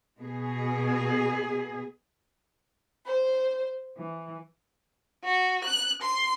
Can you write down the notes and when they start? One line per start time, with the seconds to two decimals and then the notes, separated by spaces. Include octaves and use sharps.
0.19 B2 G#4
3.05 C5
3.98 E3
5.24 F#4
5.65 F#6
6.02 C6